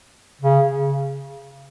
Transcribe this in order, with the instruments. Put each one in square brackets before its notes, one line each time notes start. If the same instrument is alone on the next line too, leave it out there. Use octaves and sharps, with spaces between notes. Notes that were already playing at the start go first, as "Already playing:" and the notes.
[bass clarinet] C#3